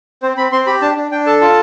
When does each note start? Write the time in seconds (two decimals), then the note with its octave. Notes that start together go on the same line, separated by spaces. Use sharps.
0.22 C4 C5
0.37 C4 B5
0.52 C4 C6
0.66 G4 B5
0.82 D4 A5
0.97 D4
1.11 D4 G5
1.26 A4 A5
1.41 F4 A5